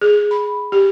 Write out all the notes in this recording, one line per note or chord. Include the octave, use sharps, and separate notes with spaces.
G#4
B5
G4